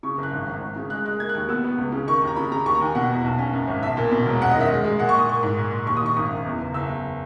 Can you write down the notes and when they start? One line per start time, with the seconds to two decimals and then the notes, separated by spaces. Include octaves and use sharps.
0.03 C#3 C#6
0.18 F#1
0.23 F#6
0.33 G#1
0.47 G#1
0.61 G#1
0.76 C#3
0.90 G#3 F#6
1.05 G#3 F#6
1.20 A#3 G#6
1.29 F#6
1.35 D#2
1.49 B3 E6
1.64 B3
1.78 C#2
1.92 C#3
2.07 D#3 C#6
2.22 D#2
2.27 A#5
2.36 C#3 B5
2.51 C#3 A#5
2.65 D#2 C#6
2.75 A#5
2.81 D#2 G#5
2.95 B2 F#5
3.10 E2
3.24 B1
3.38 C#4
3.53 F#2
3.67 G#1
3.83 B1 E5
3.97 A#2
4.11 B2
4.26 E1
4.41 F#2 F#5
4.51 D#5
4.56 D#3 E5
4.70 G#3
4.84 G#3
4.99 A#2 F#5
5.09 C#6
5.14 A#2 D#6
5.28 A#3 C#6
5.43 G#2
5.57 A#2
5.73 A#2
5.86 D#2 C#6
5.97 D#6
6.02 D#3 C#6
6.16 G#1 D#6
6.30 F#2
6.46 E2
6.61 F#1
6.74 F#1 E6
6.89 E2